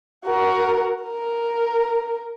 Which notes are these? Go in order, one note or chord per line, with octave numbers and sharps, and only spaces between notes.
F#4 A#4
A#4